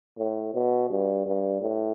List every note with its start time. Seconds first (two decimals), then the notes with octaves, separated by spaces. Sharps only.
0.18 A2
0.54 B2
0.90 G2
1.26 G2
1.61 A2